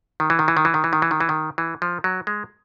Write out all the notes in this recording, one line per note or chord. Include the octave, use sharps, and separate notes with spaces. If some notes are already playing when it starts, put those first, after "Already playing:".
D#3
E3
D#3
E3
D#3
E3
D#3
E3
D#3
E3
D#3
E3
D#3
E3
F3
F#3
G#3